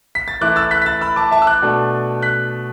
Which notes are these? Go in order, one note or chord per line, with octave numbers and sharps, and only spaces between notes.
B6
A6
E3 A3 E4 D6 F#6
E6 A6
F#6 B6
B6
E6 A6
B5 E6
A5 D6
E5 A5
E6
D6 F#6
B2 A3 D4
F#6 B6